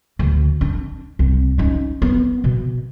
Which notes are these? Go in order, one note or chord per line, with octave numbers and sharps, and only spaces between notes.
D2
D4
C2
C#4 D#4
B3
B2